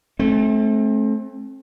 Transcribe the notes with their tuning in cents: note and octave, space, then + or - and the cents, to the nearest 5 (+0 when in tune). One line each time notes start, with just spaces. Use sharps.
A3 -25 C4 +30